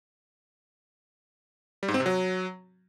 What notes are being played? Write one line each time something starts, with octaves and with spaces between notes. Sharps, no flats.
G3
G#2
C4
C3
F#3